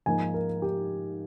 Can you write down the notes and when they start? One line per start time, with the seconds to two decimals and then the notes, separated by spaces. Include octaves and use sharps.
0.06 G#2 F3 A#3 D#4 G#5
0.34 A#4
0.62 G4